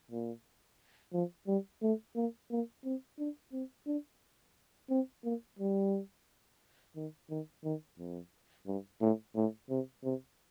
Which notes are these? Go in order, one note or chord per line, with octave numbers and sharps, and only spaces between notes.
A#2
F3
G3
A3
A#3
A#3
C4
D4
C4
D4
C4
A#3
G3
D#3
D#3
D#3
F2
G2
A2
A2
C3
C3